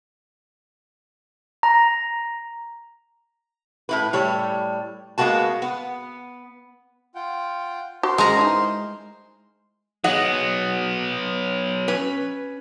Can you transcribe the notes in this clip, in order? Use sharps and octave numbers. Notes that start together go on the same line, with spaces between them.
A#5
A2 E4 B4
A2 G3 C#5
G#3 A#3 B3 F#4 A5
B3
F4 F#5 G5
F#4 A#4 C5 C6
G#3 C#4 A#5
D#4 E4 G#5
F#3 B3 G#4 D#5 F#5
C#4 B4